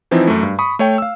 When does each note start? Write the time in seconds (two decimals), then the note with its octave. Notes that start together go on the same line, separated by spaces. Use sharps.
0.11 E3 F3 C4 D#4 E4
0.27 F#2 A3
0.43 G2
0.59 B5 C#6 D#6
0.79 A3 C#5 G5
0.98 F5 E6